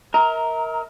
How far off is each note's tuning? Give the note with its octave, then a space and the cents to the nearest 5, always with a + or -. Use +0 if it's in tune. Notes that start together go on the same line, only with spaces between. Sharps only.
A#4 +0 E5 -45 A#5 +0